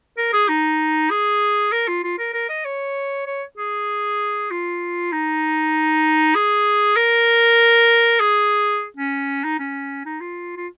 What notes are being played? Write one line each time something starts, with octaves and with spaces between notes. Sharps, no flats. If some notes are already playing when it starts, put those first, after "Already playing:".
A#4
G#4
D#4
G#4
A#4
F4
F4
A#4
A#4
D#5
C#5
C#5
G#4
F4
D#4
G#4
A#4
G#4
C#4
D#4
C#4
D#4
F4
F4